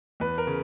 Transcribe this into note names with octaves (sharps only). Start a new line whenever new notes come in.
E2 B4
A#4
C#3